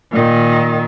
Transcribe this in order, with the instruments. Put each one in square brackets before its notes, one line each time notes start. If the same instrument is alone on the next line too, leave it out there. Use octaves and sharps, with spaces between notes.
[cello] A#2 D#3